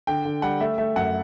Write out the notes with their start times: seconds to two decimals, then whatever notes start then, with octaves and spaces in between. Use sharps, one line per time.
0.07 D3 G5
0.25 D3
0.42 G3 F#5
0.60 A3 E5
0.78 A3 E5
0.96 F#2 F#5